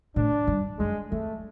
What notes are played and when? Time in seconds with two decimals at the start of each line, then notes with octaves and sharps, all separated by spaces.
0.16 A2 D4
0.47 G2
0.79 F#2 G#3
1.12 F2 A3